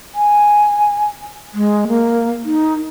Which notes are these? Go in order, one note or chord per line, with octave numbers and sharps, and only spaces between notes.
G#5
G#3
A#3
D#4